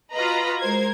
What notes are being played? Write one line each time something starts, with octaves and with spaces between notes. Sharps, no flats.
F4 F#4 B4 D#5 A#5 B5
G#3 A#4 C5 G#6